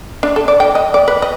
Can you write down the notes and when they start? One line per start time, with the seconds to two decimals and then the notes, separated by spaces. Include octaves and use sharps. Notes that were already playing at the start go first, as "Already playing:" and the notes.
0.23 D4
0.36 A4
0.48 D5
0.60 G5
0.75 D#5
0.94 D5
1.08 B4
1.22 D#5